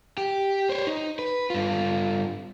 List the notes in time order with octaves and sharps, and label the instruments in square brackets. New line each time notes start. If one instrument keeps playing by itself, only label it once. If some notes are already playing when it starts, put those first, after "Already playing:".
[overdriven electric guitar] G4
C5 C#5
D#4
B4
G2 F4